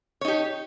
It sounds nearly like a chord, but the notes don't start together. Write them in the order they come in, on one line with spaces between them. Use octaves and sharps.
C#5 D#4 G4